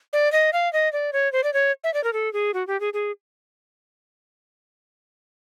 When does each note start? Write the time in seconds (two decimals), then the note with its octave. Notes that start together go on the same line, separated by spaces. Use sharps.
0.13 D5
0.32 D#5
0.53 F5
0.73 D#5
0.93 D5
1.13 C#5
1.32 C5
1.44 D5
1.54 C#5
1.84 E5
1.94 D5
2.04 A#4
2.13 A4
2.33 G#4
2.54 F#4
2.67 G4
2.80 G#4
2.93 G#4